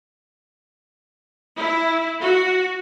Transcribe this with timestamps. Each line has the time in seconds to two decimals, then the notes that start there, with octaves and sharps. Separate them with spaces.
1.58 E4
2.22 F#4